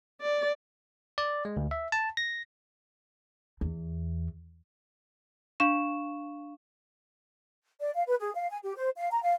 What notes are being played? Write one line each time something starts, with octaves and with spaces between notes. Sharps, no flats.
D5
D5
G#3
D2
E5
A5
A#6
E2
D4 F5 C#6 E7
D5
F5
B4
G#4
F5
G#5
G4
C5
F5
A#5
F5